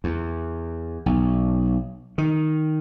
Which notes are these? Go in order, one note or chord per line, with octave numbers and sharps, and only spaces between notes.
E2
B1
D#3